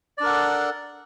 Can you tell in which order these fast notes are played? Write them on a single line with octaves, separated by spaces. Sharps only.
D5 D4 A#4 F#5 A4